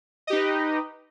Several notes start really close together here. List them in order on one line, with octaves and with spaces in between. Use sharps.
D#5 G4 D#4 B4